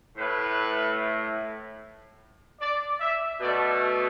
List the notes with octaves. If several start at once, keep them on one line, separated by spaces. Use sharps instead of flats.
A2 A3 B4
D5
E5
B2 A3 D5